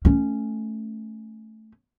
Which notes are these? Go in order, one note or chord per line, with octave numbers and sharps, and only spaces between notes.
A3 C#4